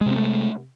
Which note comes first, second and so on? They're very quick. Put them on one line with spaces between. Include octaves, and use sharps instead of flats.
G#3 C3 C4 A3